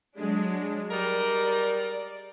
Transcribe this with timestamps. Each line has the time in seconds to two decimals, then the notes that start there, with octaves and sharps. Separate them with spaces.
0.15 F#3 G#3 D4
0.91 G3 G#3 A#4 D5